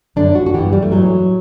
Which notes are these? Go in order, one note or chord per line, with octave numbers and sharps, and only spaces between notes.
F#2 D3 D4
F#4
F#4
G2 E3 G4
G3
A3
A2 E3 F#3